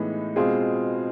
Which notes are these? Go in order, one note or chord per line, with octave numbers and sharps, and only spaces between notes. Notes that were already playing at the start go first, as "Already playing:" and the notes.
Already playing: A2 E3 G#3 B3 D#4
B2 G#3 C4 F4 G#4